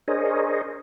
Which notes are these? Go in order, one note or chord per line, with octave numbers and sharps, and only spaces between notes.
D4 G#4 A#4 C5 C#5 D#5